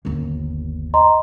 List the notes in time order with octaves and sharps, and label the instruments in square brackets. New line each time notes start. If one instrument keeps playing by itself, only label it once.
[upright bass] G1 D#2
[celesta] D#5 A#5 C6